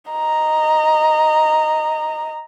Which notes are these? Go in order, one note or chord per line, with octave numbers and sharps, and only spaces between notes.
D#5 A#5